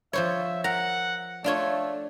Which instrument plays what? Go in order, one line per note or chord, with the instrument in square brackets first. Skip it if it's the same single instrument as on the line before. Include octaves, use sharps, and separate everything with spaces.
[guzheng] F3 C5 C#5 [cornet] E5
[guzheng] A#4 A#5 [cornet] F#5
[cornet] A3 [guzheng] D4 F4 C#5